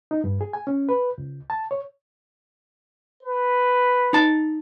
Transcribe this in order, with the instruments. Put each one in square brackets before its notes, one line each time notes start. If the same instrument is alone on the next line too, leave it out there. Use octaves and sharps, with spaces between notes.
[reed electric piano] D#4
G2
G#4
G#5
C#4
B4
C#2
A5
C#5
[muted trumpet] B4
[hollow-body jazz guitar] D#4 A5